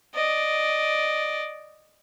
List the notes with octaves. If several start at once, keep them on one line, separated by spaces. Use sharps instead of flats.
D5 D#5